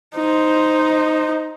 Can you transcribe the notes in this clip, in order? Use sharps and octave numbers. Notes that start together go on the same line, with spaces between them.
D#4 C5